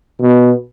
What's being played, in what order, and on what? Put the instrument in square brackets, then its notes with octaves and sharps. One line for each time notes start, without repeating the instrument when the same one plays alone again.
[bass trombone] B2